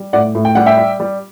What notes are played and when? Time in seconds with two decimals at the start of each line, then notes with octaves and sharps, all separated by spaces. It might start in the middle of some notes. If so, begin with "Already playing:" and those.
Already playing: G3
0.13 A2 D5 F#5
0.35 A2
0.45 G5
0.55 G3 F#5
0.66 E5 G5
0.78 G3
1.00 G3